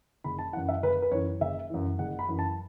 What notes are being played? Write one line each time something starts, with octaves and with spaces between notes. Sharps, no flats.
F#1 B5
A5
F#2 E3 F#5
E5
F#1 B4
B4
F#2 E3 C#5
F#1 E5
F#2 E3
F#1 F#5
B5
F#2 E3
A5